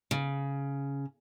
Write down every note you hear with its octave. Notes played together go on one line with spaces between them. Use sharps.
C#3